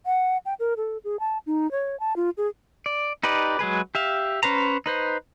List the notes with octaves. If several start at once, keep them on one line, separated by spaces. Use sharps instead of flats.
F#5
G5
A#4
A4
G#4
A5
D#4
C#5
A5
F4
G#4
D5
D#4 G4 B4 D5
F#3 G#3 G#4 B4
G4 E5 F5
C#4 B4 C5 A#5
D#4 B4 C5